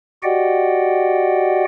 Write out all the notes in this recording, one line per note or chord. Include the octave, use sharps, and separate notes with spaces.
F#4 G4 D5 D#5 F#5 G5